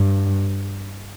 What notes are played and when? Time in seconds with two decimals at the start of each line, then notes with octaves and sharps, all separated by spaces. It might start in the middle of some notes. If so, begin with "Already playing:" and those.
Already playing: G2